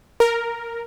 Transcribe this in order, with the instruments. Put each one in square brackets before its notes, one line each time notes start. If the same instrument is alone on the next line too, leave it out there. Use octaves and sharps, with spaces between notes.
[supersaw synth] A#4